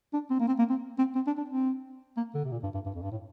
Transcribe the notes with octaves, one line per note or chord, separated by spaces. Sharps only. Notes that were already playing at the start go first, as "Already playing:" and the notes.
D4
C4
A#3
C4
A#3
C4
C4
C4
D4
D4
C4
A#3
D3
C3
A#2
G2
G2
G2
F2
G2
A2